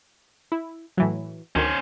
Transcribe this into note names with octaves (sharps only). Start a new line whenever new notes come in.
E4
A2 E3 F#3
D2 D#3 C#4 C5